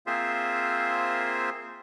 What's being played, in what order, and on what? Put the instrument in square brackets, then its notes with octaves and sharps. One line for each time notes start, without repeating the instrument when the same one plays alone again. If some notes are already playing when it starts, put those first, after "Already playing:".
[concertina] A#3 C4 F4 G#4 C5 E5